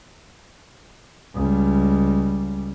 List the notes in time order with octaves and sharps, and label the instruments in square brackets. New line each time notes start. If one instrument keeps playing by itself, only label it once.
[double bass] C#2 G3